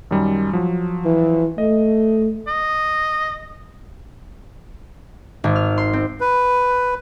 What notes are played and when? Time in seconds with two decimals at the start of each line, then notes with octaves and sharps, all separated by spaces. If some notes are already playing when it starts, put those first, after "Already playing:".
0.11 F#2 D#3 G3
0.53 F3 F#3
1.05 E3
1.58 A3 D#5
2.47 D#5
5.44 G#1
5.56 F6
5.78 C6
5.93 C4
6.21 B4